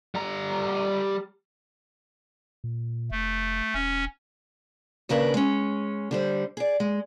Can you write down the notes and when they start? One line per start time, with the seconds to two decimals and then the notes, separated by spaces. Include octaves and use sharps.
0.15 G3 A#5
2.64 A#2
3.11 F1 A3
3.74 E1 C#4
5.09 D#2 C#3 D4 A#4 B4
5.34 G#3 C#4
6.11 D3 G3 C5
6.57 G#4 D5
6.80 G#3